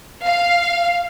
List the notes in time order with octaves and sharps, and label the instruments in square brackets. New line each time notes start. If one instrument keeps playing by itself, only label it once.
[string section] F5